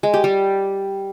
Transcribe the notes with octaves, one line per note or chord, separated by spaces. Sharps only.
G#3
G4
G3